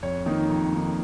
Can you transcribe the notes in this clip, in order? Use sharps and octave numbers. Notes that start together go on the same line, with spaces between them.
F2 C#5
D#3 A#3 D#4
F2
D#3 A#3 D#4